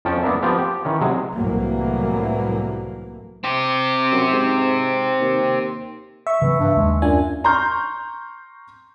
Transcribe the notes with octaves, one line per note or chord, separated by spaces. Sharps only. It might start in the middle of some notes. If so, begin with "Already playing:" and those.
F2 F3 C#4 G5 A5
A#3 B3 D4 A#4 E5
F3 B3 C4 G4
G4
D#3 E3 C#4
C3 F#3 G#3
C2 A2 E3 F#3 A3 A#3
C4 G4
F#2
G#2
D#2
E5 C#6
C#3 E3 F#3 B3
G2
D#2 G#3
F#2 D4 F4 G#5
A#5 C6 C#6 F6 G6